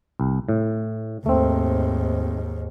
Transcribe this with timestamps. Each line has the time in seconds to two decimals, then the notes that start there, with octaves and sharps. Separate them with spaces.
0.20 C2
0.49 A2
1.26 D#2 G#2 A3 C4